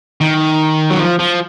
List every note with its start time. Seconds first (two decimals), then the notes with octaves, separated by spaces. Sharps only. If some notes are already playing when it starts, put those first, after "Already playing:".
0.21 D#3
0.91 F#3
1.00 F3
1.19 F3